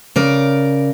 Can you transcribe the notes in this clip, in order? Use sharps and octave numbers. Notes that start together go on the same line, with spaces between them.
C#3 A#4 D5